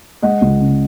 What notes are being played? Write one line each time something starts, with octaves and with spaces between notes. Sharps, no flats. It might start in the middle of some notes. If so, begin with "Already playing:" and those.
G#3 D#5 F#5
C#2
C#3